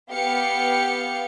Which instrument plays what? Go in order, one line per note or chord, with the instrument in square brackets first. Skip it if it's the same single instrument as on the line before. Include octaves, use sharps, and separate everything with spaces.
[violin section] B3 G4 F5 C#7